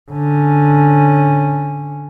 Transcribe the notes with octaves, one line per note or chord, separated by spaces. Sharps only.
D3 C#4